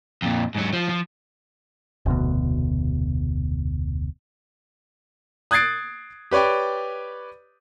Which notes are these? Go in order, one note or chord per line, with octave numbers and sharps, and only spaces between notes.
F2 A#2
G#2 F#3
F3
F3
F1 D2 B2
D#6 F#6 G#6 A6 C7 D7
G4 B4 C#5 D5 G5